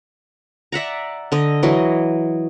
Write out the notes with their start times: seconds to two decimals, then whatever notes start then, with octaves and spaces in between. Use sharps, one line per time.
0.72 D5 E5 F#5 A#5
1.32 D3 D#5
1.63 E3 F#3 D#5